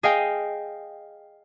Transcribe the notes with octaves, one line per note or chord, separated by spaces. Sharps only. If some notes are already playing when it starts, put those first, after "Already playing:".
G#4 D#5 F5 G5 G#5